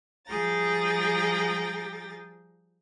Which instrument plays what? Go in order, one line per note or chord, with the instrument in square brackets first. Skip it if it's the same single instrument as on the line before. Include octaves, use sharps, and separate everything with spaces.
[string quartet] F3 G3 G#4 G5 A#5 A6